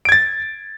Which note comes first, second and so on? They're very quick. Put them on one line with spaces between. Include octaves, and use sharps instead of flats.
D7 G#6 A6